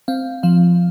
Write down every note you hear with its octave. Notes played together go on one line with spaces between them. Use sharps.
C4 F5
F3 F5